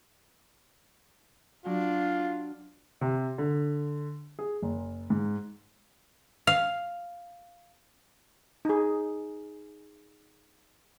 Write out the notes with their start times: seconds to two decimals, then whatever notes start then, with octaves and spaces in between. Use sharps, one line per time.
1.66 F#3 D4 F4
3.01 C3
3.38 D3
4.39 G#4
4.62 F#1
5.10 G#2
6.47 F5
8.65 D#4 G#4